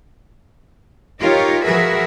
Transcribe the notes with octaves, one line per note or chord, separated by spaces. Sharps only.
D#4 F4 G4 A#4 C#5
F3 F#4 G#4 A#4 B4 E5